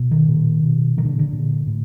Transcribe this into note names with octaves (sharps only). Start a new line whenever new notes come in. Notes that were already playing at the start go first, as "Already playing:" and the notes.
Already playing: B2
D#3
A#2
B2
A#2 D#3
D3
D3
A#2
A2